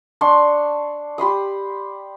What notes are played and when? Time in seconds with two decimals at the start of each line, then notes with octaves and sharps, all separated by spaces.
0.21 D4 C6 C#6
1.18 G4 B5 C6 D#6